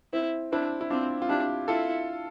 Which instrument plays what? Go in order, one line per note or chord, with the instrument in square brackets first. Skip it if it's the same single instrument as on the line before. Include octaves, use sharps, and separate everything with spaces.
[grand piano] C4 [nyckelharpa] E4
[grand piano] C4 E4 [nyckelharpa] D4
[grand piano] E4
[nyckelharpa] C4 [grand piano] D4 F4
[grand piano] F4
[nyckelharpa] D4 [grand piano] E4 G4
[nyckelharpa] E4 [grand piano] F4 A4